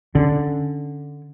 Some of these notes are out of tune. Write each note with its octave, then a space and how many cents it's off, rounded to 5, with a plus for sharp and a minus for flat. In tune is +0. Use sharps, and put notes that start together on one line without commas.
D3 +0 C#4 +5